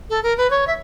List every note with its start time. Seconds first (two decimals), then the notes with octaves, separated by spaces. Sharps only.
0.10 A4
0.23 A#4
0.38 B4
0.50 C#5
0.67 E5